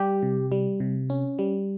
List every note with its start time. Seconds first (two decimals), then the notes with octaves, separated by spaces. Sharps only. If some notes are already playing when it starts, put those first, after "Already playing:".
Already playing: G3 G4
0.23 C3
0.52 G3
0.80 C3
1.10 C#4
1.39 G3